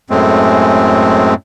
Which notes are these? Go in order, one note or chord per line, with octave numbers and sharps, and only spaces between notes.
F#2 A2 G#3 A3 C4